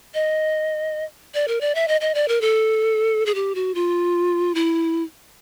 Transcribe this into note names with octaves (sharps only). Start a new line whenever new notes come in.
D#5
D5
A#4
D5
E5
D#5
D#5
D5
A#4
A4
G#4
G4
F#4
F4
E4